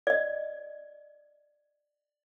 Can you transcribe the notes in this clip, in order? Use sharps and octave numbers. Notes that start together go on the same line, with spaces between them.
D5 D#5